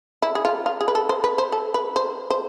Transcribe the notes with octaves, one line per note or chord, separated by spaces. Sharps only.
E4
G#4
F4
F4
G#4
B4
A4
C5
B4
C5
A4
B4
C5
C5